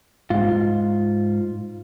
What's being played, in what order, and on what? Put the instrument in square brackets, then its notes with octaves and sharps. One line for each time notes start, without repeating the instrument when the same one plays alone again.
[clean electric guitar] G#2 F4